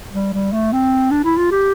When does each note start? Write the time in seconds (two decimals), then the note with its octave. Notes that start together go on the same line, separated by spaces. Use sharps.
0.13 G3
0.33 G3
0.53 A3
0.72 C4
1.11 D4
1.24 E4
1.37 F4
1.51 G4